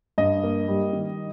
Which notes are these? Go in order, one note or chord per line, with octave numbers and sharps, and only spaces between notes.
G2 D#5
A#3
G3
D#3